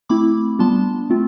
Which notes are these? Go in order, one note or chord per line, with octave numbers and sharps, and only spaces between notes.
A3 C4 E4 B5 D6
G3 B3 D4 F4 A5 C6
A3 C4 F4